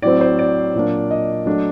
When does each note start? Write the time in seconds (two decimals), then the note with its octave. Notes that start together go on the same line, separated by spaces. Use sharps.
0.02 A2 F#3 C4 D5
0.21 C5
0.39 D5
0.75 A#2 F#3 A#3 D4
1.11 D#5
1.46 F#3 A3 D4